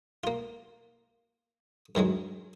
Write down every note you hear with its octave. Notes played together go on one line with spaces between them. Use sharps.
A#3 F4
G2 D#3 F#3 G#3